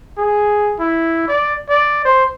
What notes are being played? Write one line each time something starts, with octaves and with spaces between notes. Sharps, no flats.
G#4
E4
D5
D5
C5